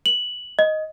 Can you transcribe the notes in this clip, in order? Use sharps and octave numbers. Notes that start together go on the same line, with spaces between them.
F#7
D#5